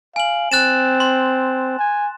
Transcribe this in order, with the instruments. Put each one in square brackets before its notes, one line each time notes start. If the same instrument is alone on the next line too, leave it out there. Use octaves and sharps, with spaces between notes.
[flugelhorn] F5 [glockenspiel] G#5 F#7
[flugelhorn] C4 [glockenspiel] F#6 A6 E7
[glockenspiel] C6
[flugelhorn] G#5